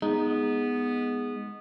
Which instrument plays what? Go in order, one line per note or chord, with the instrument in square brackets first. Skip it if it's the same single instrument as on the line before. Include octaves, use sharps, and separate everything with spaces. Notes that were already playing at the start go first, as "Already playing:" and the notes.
[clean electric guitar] G#3 [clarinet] B3 [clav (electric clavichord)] D#4